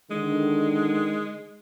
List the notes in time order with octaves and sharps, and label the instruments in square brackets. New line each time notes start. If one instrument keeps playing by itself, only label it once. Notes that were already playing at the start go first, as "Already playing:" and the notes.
[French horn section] D3 D#3 [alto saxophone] G#3